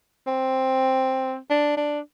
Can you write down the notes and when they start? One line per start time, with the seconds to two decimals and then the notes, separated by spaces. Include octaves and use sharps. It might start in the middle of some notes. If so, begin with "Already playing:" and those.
0.27 C4
1.50 D4
1.77 D4